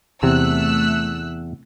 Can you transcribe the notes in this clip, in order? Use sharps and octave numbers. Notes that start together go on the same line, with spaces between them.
E2 C3 A3 E6 F#6